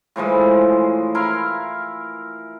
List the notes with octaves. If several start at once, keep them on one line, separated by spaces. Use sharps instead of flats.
A2 E3 F3 G#3
E4 A#4 F5 C6